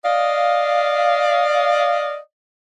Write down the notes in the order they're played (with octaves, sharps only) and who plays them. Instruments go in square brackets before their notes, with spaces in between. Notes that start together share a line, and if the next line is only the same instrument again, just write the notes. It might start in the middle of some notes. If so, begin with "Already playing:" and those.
[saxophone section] D5 D#5 F5